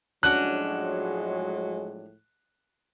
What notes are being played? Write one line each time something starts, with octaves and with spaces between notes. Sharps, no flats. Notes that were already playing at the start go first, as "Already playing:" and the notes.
A2 F3 F#3 G#3 C#4 D4 F#4 F#6